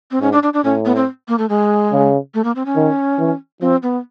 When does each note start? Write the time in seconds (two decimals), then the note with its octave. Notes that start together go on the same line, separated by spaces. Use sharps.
0.11 C4
0.21 G#2 C#4
0.33 D4
0.43 D4
0.54 D4
0.64 A2 C#4
0.85 B3
0.96 C4
1.28 A#3
1.39 A3
1.49 G#3
1.92 C#3
2.34 A3
2.44 A#3
2.56 C4
2.66 C#4
2.76 D#3
3.19 E3
3.61 F3 C4
3.83 B3